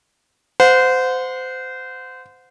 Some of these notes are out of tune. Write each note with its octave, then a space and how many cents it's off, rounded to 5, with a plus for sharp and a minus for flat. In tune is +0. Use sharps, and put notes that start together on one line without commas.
C5 -25 F#5 -35